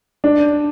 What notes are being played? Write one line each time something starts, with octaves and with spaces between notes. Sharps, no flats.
D4